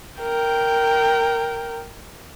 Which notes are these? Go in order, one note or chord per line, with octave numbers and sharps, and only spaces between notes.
A#4 G5